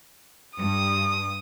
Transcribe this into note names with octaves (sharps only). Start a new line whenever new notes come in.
G2 D#6